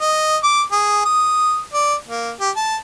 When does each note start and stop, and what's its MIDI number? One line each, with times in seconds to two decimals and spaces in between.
0.01 0.37 75
0.43 0.62 86
0.72 1.03 68
1.05 1.60 87
1.73 1.95 74
2.08 2.31 58
2.40 2.50 67
2.56 2.76 81